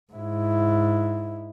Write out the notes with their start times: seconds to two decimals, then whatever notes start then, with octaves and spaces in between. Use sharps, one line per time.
0.12 G#2 E4